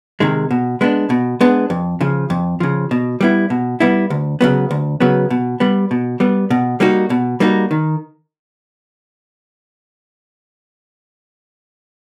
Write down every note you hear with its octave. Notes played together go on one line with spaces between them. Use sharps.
C3 D#3 G#3
B2
G#3 B3 D4
B2
G#3 B3 D4
F2
C#3 F3
F2
C#3 F3
B2
G3 B3 E4
B2
G3 B3 E4
D2
C#3 F#3 B3
D2
C#3 F#3 B3
B2
G3 B3
B2
G3 B3
B2
G3 A#3 D#4 F#4
B2
G3 A#3 D#4 F#4
D#3